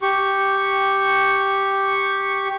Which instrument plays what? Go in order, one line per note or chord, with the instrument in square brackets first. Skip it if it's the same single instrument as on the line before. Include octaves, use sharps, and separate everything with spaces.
[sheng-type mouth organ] G4 C#6